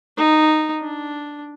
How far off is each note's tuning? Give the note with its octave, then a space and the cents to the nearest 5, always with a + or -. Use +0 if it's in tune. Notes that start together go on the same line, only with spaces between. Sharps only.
D#4 -10
D4 +0